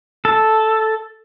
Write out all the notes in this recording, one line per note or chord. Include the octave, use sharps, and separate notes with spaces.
A4